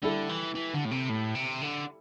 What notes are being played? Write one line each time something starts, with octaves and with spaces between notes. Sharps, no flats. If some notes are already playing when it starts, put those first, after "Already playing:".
D3 G3 E4 A4
E3
E3
D3
A2
C3
A2
C3
D3